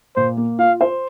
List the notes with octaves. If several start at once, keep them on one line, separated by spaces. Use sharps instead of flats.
A#2 C5
A#3
F4 F5
C5